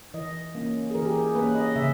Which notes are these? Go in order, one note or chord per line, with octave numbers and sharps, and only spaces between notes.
E3 D#5
A#3 C#4
G#4
E3 A#4
G4
G#4
A#3 C#4 B4
D#5
C#3 E5